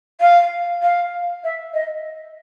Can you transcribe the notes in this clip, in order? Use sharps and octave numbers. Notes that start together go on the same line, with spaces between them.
F5
F5
E5
D#5